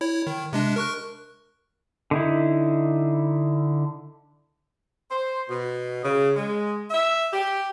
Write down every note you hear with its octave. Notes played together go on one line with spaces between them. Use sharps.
E4 C#5
D#3
C3 G#3 D4
A#4 C#6 F#6
D3 D#4 E4
C5
B2
C#3
G#3
E5
G4